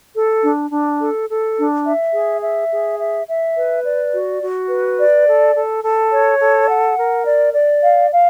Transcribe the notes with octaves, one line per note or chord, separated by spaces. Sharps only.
A4
D4
D4
A4
A4
D4
E5
G#4
E5
G#4
E5
E5
B4
D5
F#4
F#4
B4
D5
A4
A4
A4
C#5
A4
F#5
A#4
D5
D5
F5
F5